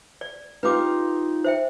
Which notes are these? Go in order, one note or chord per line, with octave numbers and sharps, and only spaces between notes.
D5
D#4 F4 G4 B4 D6
C5 E5 G5